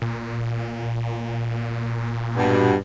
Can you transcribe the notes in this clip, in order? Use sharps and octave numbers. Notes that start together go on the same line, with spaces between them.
A#2
G2 B2